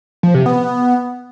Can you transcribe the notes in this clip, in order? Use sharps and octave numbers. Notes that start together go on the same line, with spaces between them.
F3
C3
B3